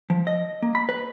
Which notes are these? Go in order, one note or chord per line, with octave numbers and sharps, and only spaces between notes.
F3
D#5
A#3
B5
B4